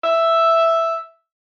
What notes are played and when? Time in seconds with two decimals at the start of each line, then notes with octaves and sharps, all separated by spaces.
0.04 E5